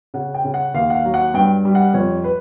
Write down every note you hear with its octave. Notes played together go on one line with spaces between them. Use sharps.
C#3 F#5
G5
C#3
F#5
D#2 F5
F#5
F5
F#3
F#5
G2 G5
G3
F#5
F2 C#5
B4